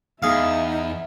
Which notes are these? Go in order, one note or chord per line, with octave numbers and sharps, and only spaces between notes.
E2 D#4 G#4 E5 F5